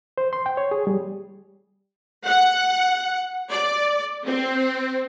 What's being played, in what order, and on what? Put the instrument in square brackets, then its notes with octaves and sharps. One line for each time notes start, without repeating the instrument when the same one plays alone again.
[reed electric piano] C5
C6
G5
C#5
G#4
G3
[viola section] F#5
D5
C4